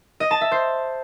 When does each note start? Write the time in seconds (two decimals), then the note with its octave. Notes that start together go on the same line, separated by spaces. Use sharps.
0.20 D#5
0.31 A5
0.41 E5
0.52 C5